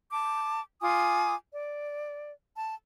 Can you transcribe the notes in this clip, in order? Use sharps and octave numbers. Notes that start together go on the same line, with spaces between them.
A5 D6
F4 G#5 D6 D#6
D5
A5